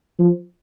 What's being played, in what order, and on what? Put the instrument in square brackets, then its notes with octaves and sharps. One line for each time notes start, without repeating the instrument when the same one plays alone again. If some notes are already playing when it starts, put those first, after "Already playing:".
[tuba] F3